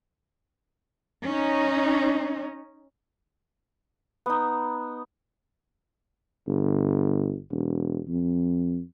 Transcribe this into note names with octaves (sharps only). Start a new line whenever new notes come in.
C#4 D#4
B3 D#4
G1
E1
F2